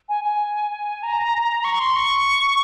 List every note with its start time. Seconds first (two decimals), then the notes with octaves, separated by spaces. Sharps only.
0.09 G#5
0.24 G#5
1.03 A#5
1.64 C#6
1.80 C6
1.96 C#6